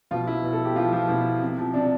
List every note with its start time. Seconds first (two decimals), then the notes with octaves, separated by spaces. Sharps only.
0.11 B2 F3 F4
0.27 E4
0.44 B2
0.53 A4
0.65 G4
0.76 B2 F3 F4
0.93 F3 F4
1.09 B2 E4
1.41 C3
1.58 F3
1.74 C3 D4